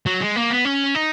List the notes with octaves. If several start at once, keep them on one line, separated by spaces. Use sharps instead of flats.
F#3
G#3
A#3
B3
C#4
D#4